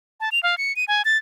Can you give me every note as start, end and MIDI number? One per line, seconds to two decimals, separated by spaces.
0.20 0.30 81
0.32 0.42 101
0.43 0.58 77
0.58 0.75 97
0.76 0.85 99
0.88 1.02 80
1.05 1.18 93